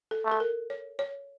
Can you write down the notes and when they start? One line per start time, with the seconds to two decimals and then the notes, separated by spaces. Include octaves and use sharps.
0.11 A4
0.25 A3
0.32 A4
0.40 A#4
0.70 C#5
0.99 C#5